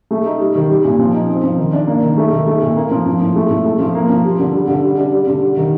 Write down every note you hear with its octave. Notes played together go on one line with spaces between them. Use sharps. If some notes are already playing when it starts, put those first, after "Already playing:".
A3
D#4
G3
D#3
G3
A#2
F3
D#4
C4
F3
D#3
D4
A#3
D#3
A3
D#3
A3
A#2
A#3
F3
F3
A2
A3
A2
A3
F3
A#3
F3
G3
D3
G3
D3
G3
D4
G3
D3
G3
D#3